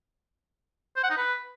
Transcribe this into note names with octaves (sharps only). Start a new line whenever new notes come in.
C5
F#5
D#4
B4